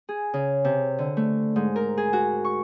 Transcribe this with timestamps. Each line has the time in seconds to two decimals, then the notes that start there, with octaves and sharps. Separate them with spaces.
0.09 G#4
0.34 C#3
0.65 C3
0.99 D3
1.17 A3
1.56 G#2
1.76 A#4
1.97 G#4
2.13 F#4
2.45 C#6